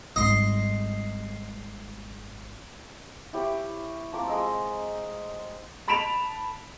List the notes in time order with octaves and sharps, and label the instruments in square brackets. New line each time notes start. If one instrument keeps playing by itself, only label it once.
[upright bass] G#1 G3 [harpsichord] D#5 C6
[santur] E4 G4 C#5
F3 C4 A#4 D6
G#3 D#5 E6
[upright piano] A5 B5 B6 D7 E7 F7